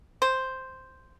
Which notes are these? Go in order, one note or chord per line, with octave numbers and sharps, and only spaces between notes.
C5